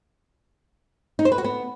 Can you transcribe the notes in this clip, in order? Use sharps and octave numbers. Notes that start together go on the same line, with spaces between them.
D#4
C5
B4
F#4
B3